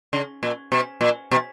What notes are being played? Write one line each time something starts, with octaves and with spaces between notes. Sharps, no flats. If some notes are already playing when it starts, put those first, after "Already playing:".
C#3
A#2
B2
A#2
B2